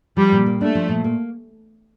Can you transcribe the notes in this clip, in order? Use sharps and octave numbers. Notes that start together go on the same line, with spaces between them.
F3 G3
A#2
A#3
A3 D4
F3
A#2
A#3